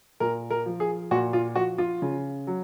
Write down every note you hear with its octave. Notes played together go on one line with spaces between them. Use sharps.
A#2 A#4
A#4
F3
G#4
A#2 F#4
F4
F3 F#4
F4
C#3
F#3